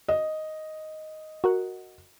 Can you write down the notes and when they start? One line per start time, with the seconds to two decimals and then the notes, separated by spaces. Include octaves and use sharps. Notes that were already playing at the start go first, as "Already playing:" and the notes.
0.08 D#5
1.44 F#4 A#4 F#5